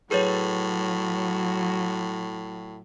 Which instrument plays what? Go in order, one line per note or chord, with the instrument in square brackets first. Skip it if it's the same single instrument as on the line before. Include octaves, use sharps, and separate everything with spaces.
[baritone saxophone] A2 [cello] F#3 [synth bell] G#4 B4 C#5